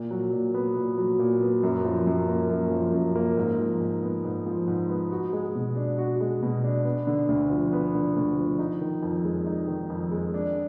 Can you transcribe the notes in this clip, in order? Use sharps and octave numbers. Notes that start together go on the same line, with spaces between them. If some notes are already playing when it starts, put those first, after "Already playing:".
Already playing: A#2
F#3
A#2
B3
A#2
F#3
A#2
B3
F#2
F3
F#2
A#3
F#2
F3
F#2
A#3
G#2
F3
G#2
B3
G#2
F3
G#2
B3
F#4
G#3
B2
D4
F#4
G#3
B2
D4
B3
D3
D2
F3
B3
D3
D2
F3
D#4
D#3
F2
G#3
D#4
D#3
F2
G#3
D4